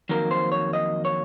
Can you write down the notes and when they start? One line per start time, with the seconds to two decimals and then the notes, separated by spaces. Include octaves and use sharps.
0.09 F2 D#3 F#3 A#3 A#4
0.31 C5
0.52 C#5
0.73 D#5
1.05 C#5